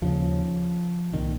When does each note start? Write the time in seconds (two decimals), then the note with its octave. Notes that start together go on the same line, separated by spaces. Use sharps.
0.02 D#2 C#3 F3
1.12 C2 A#2 D#3